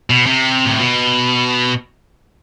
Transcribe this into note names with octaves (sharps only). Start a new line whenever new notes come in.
B2
C3
A2
B2